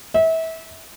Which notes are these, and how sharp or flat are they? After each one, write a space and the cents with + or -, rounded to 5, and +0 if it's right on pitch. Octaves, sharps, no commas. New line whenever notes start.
E5 -30